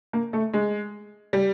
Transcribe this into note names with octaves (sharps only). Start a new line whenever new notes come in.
A#3
A3
G#3
G3